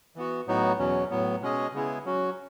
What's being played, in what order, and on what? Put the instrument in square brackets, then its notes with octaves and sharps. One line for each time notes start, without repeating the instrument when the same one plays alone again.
[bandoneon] E3 B3 F#4
A2 F#3 B3 D#4 F#4
E2 B2 F#3 C#4
A2 F#3 B3
B2 G#3 C#4 G#4 D#5
C#3 G#3 B3 E4 G#4
F#3 C#4 F#4